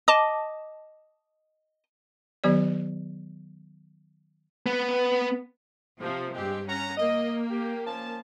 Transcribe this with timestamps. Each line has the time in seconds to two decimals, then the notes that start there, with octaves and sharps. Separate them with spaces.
0.08 D#5 A5 D6
2.44 D#3 F#3 B3 G4 D5
4.66 B3
6.00 C3 F3
6.34 G2 G#3 C4 G4
6.67 C#4 F#5 A#5
6.97 A#3 D#5
7.50 G4
7.86 F3 C#4 A5